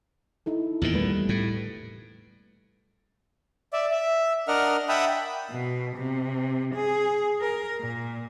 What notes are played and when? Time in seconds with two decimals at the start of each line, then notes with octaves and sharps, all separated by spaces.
0.46 D#4 E4 A4
0.82 E2 A#2 D#3
0.94 G3 A3 B4
1.29 A2
3.73 D5 E5
3.91 E5
4.48 D4 A#4 D#5 F#5 F6
4.89 E5 F#5 G5 A5 B5 D#6
5.50 B2
5.96 C3
6.75 G#4
7.41 A#4
7.81 A#2